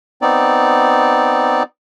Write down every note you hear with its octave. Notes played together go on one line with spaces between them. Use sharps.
B3 C4 D#4 D5